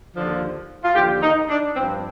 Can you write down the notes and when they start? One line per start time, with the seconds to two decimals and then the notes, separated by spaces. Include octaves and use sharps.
0.15 D#2 D3 F3
0.83 F4
0.95 D#2 D3 F3 G4
1.22 D#4
1.49 D4
1.75 G2 F3 C4